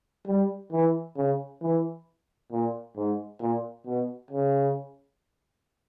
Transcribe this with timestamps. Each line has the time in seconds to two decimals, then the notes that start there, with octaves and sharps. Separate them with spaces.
0.27 G3
0.72 E3
1.17 C#3
1.62 E3
2.52 A#2
2.97 G#2
3.41 A#2
3.86 B2
4.31 C#3